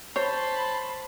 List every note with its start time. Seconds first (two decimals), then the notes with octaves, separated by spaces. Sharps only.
0.16 C5 C#5 A5 B5 C6